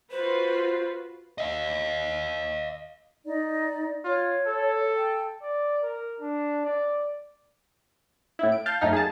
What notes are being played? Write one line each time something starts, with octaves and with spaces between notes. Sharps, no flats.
F4 F#4 B4 C5
D#5 F5
D#4 D5
F4 C#5
A4
G5
D5
A#4
D4
D5
A2 E4
D7
F5 A5 G6
F#2 A3 A#3 D#4 F6
G#4 A5